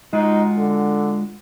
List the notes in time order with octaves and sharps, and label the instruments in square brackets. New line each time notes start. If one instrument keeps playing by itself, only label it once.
[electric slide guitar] G#3 F4 F#4 [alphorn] D#4
[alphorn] D3